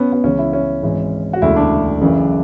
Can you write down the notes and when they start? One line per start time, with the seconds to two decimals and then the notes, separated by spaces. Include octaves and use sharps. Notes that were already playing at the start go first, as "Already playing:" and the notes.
Already playing: B2 B3 C#4
0.13 B3
0.24 C#2 C#3 E3 C#4
0.39 E4
0.53 C#4
0.83 G#1 G#2 E3
1.33 F#4
1.42 E1 D2 C#3 E4
1.56 D4
2.01 F#1 F#2 C#3 E3